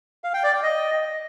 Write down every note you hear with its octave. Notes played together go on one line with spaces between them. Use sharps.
F5
G5
D5
G5
D#5